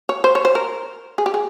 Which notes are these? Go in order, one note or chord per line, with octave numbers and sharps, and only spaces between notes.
C#5
C5
C#5
C5
A#4
G#4
G4
G#4